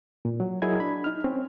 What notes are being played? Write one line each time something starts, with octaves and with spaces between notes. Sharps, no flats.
A#2
F#3
F#3 E4 G#4 A#4 D#5 G#6
D4 B5
D#4 F6
C4 C#4